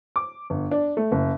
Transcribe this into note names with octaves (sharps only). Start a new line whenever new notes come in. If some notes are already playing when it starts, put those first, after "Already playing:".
D6
G1
D4
A3
F#1